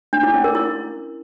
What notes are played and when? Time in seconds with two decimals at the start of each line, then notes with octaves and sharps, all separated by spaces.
0.13 D4
0.23 E4
0.34 C#4
0.44 A#4
0.55 E4